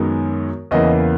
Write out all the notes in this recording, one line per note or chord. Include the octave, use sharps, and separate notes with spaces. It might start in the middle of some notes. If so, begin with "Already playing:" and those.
Already playing: F#2 D#3 G#3 B3
E2 C#3 E3 A#3 D#5